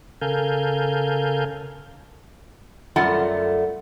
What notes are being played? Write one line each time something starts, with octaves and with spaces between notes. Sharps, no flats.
C#3 A4 A#4 F5 G#5 G6
F#2 G3 A3 F4 F#5